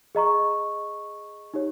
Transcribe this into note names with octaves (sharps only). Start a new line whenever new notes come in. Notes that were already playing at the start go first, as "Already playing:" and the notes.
G#4 D#5 A#5 C#6
D#4 G4 C#5